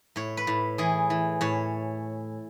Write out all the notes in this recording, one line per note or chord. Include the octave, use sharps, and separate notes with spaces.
A2 C#5
B4
A2
E3 G#4
E3
A2 C#5